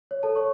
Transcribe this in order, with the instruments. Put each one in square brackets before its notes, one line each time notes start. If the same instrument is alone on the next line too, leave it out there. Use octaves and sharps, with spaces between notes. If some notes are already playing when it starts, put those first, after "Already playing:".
[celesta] C#5
A4 A5
C#5 C#6